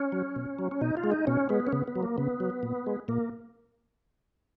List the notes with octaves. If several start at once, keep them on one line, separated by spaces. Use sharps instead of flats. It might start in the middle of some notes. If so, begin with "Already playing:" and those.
Already playing: C#4
F#3
B2
F#3
C#4
B2 D#4
F4
G#3
D#4
B2 C#4
G#3 B3
C#4
C#3 B3
B3
F#3
A#3
C#3 B3
F#3
A#2
G#3
A#2 A#3